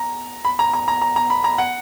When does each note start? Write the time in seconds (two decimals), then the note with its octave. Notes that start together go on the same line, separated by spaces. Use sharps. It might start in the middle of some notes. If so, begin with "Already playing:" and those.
Already playing: A#5
0.45 B5
0.59 A#5
0.74 A#5
0.88 A#5
1.02 A#5
1.16 A#5
1.30 B5
1.44 A#5
1.58 F#5